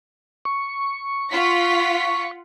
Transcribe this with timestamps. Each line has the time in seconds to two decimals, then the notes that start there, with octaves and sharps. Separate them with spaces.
0.45 C#6
1.31 F4 F#5 B6